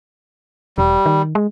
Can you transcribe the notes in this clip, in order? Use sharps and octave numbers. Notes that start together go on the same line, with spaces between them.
E1 G3
D#3
G#3